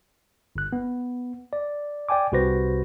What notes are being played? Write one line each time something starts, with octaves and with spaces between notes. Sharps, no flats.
G1 F#6
B3
D5
D5 G5 G#5 D6
C2 C3 F#4 B4 C5 A#6